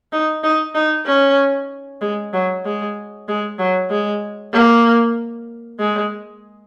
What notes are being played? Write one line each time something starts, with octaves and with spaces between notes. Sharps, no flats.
D#4
D#4
D#4
C#4
G#3
F#3
G#3
G#3
F#3
G#3
A#3
G#3